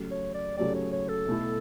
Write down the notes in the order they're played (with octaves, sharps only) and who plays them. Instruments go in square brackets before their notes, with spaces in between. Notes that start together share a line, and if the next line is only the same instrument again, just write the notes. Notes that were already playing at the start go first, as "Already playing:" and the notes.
Already playing: [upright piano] C#3 F#3 A3 C#4 G4
[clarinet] C#5
D5
[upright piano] C#3 F#3 A3 C#4 G4 [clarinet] D5
[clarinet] C#5
C#5
A4
[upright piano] B2 A3 E4